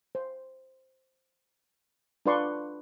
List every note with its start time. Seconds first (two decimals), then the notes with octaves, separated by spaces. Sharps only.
0.15 C5
2.26 D4 F4 B4 D5 C6 C#6